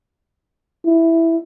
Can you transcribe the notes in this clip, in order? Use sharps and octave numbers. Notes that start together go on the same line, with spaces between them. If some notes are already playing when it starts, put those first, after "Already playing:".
E4